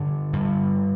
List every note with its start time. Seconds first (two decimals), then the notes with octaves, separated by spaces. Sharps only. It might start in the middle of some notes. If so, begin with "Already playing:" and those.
Already playing: G2 D3
0.33 G2